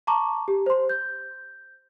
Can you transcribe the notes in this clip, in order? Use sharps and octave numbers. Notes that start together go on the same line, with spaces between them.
A5 A#5 C#6 D6
G4
C5 C6
G6